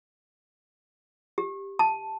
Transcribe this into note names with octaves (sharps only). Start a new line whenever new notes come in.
G4
A5